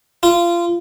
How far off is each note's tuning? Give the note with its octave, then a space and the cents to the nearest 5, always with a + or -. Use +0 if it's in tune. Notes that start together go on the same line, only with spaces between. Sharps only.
F4 -20